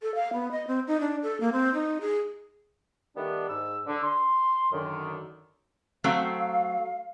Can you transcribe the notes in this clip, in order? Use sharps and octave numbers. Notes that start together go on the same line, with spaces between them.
A4
F5
B3
D#5
C4
D#4
D4
A4
A#3
C4
D#4
G#4
D#3 G3 A3 B3 D4
G#2 E6
D3
C6
F#2 D3 D#3
F#3 A3 C4 F5